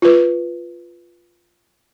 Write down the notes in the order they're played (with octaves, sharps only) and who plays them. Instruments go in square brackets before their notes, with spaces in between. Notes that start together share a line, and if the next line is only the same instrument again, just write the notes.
[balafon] F4 B4